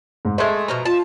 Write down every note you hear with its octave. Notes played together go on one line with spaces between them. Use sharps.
G#2
G#3 A3 C5 D#5 E5
B2 F3 A#5
F4 A5